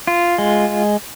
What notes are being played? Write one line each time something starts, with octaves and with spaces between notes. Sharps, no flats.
F4
G#3